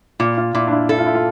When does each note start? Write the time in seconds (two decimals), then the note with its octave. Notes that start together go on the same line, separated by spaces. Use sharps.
0.20 A#2 F4
0.37 F4
0.55 A#2 E4
0.67 D4
0.72 E4
0.89 E4 A4
0.98 F4
1.06 E4
1.15 F4